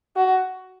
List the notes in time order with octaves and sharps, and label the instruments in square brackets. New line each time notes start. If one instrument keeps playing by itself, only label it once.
[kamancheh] F#4